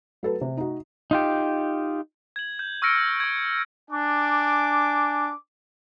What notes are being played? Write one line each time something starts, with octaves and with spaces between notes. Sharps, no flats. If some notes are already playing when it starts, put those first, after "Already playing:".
F#3 A4 B4
C3
D#4 F#4
D#4 F4 G4
G#6 F#7
G6
C#6 E6 F6 A#6 C#7 D7
C#6 G#6
D4 G#5 D6